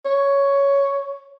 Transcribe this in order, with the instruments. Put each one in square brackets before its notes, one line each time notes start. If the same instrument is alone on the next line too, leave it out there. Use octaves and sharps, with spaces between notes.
[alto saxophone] C#5